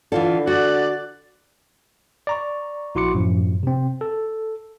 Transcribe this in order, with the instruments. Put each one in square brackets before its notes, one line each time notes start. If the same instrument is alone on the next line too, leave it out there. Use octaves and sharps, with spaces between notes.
[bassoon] D3 [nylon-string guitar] E3 F4 A4
[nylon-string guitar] F#4 [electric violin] D5 F#6
[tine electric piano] D5 A#5 C#6
A#1 E4 F#4 C6 D6 C#7
F#2 A2 F3
C3 C4
A4